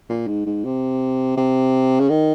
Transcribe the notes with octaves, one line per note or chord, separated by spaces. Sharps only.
A#2
G#2
G#2
C3
C3
C#3
D#3